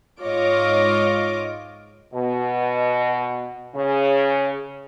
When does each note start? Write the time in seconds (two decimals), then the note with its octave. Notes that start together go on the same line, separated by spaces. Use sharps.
0.22 G#2 F4 C#5 D#5 D6
2.13 B2
3.75 C#3